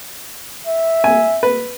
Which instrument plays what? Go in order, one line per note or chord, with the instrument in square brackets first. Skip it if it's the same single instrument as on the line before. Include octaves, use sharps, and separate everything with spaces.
[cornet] E5
[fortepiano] G#5
B4